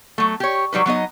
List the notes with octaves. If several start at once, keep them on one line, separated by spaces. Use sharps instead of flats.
F#3 A3
G4 C#5
F#3 G3 D#4 B4
F#3 B3 D#4 D#5